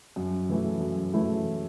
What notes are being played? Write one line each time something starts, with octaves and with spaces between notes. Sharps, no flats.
F#2
E3 A3 E4
F#2
E3 A3 E4